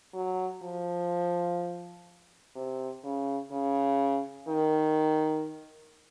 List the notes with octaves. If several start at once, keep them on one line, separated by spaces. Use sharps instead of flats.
F#3
F3
C3
C#3
C#3
D#3